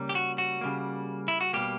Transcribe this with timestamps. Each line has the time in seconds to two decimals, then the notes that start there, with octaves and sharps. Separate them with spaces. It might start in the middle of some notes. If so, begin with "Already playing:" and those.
Already playing: C#3 G3 A#3
0.09 G4
0.15 F#4
0.38 F#4
0.61 C#3 G3 A#3
1.28 E4
1.41 F#4
1.53 B2 G3 A#3 G4